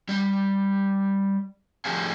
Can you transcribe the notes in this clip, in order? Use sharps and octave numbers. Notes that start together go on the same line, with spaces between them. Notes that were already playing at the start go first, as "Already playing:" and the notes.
G3 G4
F3 A3 G4 G#4 F5 G#5